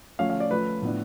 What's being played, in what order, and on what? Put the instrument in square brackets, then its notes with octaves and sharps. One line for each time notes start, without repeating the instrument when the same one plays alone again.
[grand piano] F3 A3 C#4 F5
F5
D5
F3 A3 C#4 B4
A2 F3 B3 D4